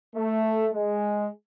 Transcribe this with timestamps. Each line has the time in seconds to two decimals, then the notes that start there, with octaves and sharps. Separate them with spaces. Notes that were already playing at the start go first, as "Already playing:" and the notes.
0.16 A3
0.74 G#3